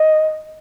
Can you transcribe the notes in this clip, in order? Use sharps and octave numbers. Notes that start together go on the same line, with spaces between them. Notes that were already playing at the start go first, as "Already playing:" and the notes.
Already playing: D#5